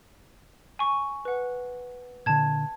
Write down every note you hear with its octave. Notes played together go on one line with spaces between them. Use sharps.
G#5 C#6
B4 F#5
A#2 D3 A5 G#6